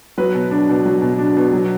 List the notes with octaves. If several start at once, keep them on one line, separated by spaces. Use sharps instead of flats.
F#3 B4
B2
D4
B2
F#3
B2
D4
B2
F#3